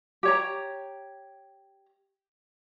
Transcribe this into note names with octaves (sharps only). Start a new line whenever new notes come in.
G4 C#5 A#5